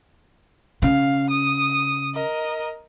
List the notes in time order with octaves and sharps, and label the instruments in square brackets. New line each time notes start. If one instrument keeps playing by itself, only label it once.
[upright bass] C#3 [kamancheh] F5
[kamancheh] D#6
A#4 D#5